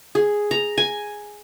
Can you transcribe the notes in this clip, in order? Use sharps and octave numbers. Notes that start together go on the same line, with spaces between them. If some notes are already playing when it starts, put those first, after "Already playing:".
G#4
A#5
G#5